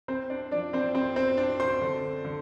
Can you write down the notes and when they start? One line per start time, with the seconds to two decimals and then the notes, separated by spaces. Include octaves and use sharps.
0.08 C4 C5
0.30 D4 D5
0.51 F3 D4 D5
0.73 C4 C5
0.95 C4 C5
1.16 C4 C5
1.37 C4 D4 D5
1.60 C5 C6
1.82 D3
2.25 D3